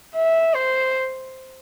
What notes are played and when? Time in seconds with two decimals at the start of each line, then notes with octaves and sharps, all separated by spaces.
0.15 E5
0.54 C5